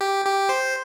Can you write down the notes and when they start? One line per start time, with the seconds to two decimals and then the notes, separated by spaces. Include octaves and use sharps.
0.01 G4
0.26 G4
0.49 C5